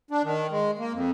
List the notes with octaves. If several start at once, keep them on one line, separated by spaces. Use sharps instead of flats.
D4
D#3
G#3
A#3
F2